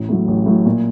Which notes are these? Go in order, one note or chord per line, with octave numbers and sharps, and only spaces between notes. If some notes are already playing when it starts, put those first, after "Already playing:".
Already playing: A1
A2 F#3
A1
A2 F#3
A#2